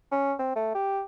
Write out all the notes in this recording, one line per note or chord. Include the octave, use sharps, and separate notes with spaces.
C#4
C4
A3
G4